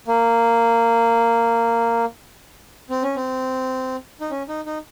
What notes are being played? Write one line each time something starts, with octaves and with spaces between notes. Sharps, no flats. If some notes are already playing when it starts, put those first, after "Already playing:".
A#3
C4
C#4
C4
D#4
C#4
D#4
D#4